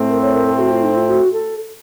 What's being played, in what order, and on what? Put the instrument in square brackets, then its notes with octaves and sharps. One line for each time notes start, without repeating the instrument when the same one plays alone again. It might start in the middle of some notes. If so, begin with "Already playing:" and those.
Already playing: [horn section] A2 A3 C4
[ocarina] A#4
C#5
A#4
A4
F#4
F4
D#4
F4
F#4
A4